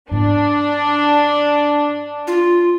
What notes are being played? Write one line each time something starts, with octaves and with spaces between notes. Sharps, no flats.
G#2 B3 D4
F4